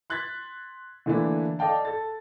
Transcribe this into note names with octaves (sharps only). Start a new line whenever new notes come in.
C6 F#6 G#6 A6 B6
D3 E3 A3 A#3 D4 E4
A4 D5 D#5 F5 G5 A5
A4 A6